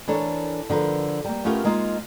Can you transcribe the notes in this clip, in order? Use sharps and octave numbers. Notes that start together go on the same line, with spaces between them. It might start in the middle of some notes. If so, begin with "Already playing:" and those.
E3 D4 A4 A#4 C#5
D3 F3 A#4 B4
G3 A#3
A3 B3 C#4 F4 G4 A#4
G#3 A#3 D#4 F4